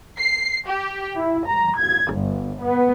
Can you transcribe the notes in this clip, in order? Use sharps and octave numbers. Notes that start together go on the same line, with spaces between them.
C7
G4
E4
A#5
G#6
G1
B3